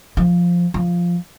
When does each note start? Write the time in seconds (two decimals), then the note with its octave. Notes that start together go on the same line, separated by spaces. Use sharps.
0.17 F3
0.74 F3